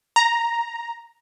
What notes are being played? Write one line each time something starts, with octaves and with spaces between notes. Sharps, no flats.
A#5